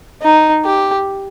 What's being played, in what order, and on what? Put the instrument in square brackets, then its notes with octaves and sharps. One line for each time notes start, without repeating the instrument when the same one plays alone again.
[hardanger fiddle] D#4
G4